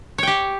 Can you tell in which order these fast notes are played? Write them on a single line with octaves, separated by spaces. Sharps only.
C#5 G5 G4